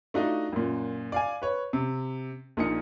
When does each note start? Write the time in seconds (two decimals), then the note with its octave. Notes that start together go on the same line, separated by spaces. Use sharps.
0.14 A3 D4 D#4 F4 F#4 D#5
0.52 F#2 A#2
1.12 D5 F5 G#5
1.42 B4 C#5
1.73 C3
2.57 A#1 A#2 D#4 D#6 C#7